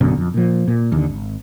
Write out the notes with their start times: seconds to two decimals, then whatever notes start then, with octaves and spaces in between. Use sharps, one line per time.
0.01 A1 F#2 B2 D3
0.18 F2
0.34 A#2 F3
0.68 A#2
0.92 D#2 D3
1.08 G#1